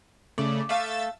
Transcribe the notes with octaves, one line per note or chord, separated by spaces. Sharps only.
C#3 A3 D5
A3 A4 E5 F5 E6 A6